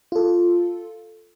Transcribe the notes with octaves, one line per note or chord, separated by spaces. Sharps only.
F4 A4